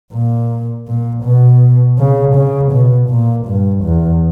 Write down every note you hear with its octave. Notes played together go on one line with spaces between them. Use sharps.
A#2
A#2
B2
C#3
C#3
B2
A#2
G2
E2